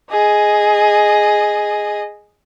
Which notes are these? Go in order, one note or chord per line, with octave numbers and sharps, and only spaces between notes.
G#4 D#5